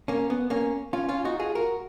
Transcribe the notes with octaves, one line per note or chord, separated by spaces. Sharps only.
A#3 C#4
B3
A#3 C#4
C#4 F4
C#4 F4
D#4 F#4
F4 G#4
F#4 A#4